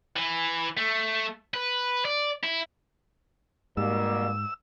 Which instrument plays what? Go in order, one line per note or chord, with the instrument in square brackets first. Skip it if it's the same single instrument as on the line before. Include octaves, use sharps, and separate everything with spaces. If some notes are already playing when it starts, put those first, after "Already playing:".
[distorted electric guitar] E3
A3
B4
D5
E4
[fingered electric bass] G#2 [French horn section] B2 G3 A#3 [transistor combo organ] E6